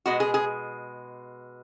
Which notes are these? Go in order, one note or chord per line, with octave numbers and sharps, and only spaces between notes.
B2 G#3 F#4
G#4
G#4